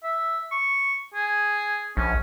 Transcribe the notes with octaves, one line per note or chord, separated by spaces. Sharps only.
E5
C#6
G#4
A#1 C#4